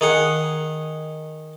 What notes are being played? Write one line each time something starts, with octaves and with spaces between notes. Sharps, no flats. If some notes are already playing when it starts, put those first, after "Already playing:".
D#3 G#4 F#5